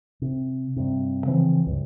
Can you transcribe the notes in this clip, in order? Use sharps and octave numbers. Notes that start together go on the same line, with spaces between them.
C3
G2 C3
C#3 E3 F3 C4
C#2 G2